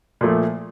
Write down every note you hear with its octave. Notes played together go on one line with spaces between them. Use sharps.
A#2 F3 A3